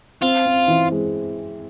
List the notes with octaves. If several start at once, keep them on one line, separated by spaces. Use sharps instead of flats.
C4 F4
C4
E3
G#3